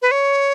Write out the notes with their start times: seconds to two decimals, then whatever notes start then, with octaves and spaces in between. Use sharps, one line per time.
0.02 B4
0.11 C#5